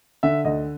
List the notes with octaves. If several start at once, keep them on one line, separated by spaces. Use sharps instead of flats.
D3 E5
D2 D#5